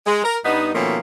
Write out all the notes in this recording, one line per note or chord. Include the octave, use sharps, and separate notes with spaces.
G#3
A#4
G2 B3 D#4
B2 D#3 F3 A3 A#3 C#4